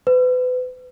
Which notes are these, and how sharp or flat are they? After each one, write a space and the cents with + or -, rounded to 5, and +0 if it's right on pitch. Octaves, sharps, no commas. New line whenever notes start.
B4 +35